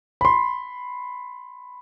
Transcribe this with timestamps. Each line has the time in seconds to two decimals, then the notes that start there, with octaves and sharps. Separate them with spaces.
0.21 B5 C6